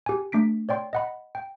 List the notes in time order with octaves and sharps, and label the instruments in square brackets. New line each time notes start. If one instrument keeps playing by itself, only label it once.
[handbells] G4 G#5
A3 D4 B6 D7
C#5 D5 G5 C6
D#5 F#5 B5
G5